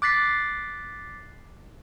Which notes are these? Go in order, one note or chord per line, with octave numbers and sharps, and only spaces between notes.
D6 F#6 A6 B6 C7